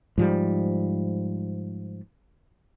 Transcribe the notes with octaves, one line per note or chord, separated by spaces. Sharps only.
G#2 F3 G3